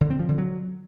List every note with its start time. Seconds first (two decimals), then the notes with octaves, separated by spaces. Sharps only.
0.01 D3
0.10 C4
0.19 F3
0.29 D3
0.38 F#3